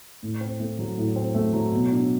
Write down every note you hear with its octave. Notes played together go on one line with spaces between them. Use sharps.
A2
C4
A3
F#3
A2
C4
A3
F#3
B2
D4